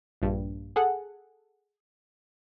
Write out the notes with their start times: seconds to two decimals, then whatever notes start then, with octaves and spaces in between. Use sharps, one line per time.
0.22 A#1 G2
0.76 G#4 A4 F#5